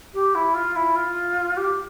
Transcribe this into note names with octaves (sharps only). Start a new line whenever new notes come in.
G4
E4
F4
E4
F4
G4